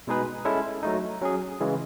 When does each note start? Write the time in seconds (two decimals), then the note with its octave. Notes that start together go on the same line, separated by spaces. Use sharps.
0.07 B2 G#3 D#4 G#4 B4
0.45 G#3 C#4 E4 A4
0.83 F#3 A3 D#4
1.21 F#3 C#4 G#4
1.60 C#3 E3 G#3